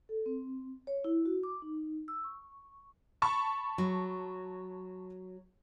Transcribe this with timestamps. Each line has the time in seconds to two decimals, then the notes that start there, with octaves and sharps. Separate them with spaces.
0.09 A4
0.26 C4
0.87 C#5
1.04 E4
1.25 F#4
1.43 D6
1.62 D#4
2.08 E6
2.24 C#6
3.22 A5 B5 C#6
3.78 F#3